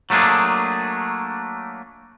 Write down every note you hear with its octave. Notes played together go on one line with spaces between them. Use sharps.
F#3 A3 A#3 D4 G#4